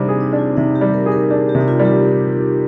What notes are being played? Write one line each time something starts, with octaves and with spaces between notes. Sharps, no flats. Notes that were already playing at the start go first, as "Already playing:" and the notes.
Already playing: C3 G3 C4 D4 D#4 C5
G#4
D#4
D4
F4
C3 D#4
G4
G3
A#4
G#4
A#4
D4 G4
G4
C3
D#4
F4
G3
G4